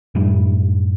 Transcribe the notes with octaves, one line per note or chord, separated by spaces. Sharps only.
F#2 A2 G3